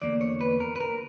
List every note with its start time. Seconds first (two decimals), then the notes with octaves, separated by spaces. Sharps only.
0.02 E2 D3 A#3 D5
0.21 C#5
0.41 B4
0.60 A#4
0.76 B4
0.81 A#4